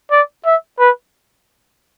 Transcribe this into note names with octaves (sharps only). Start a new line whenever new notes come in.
D5
E5
B4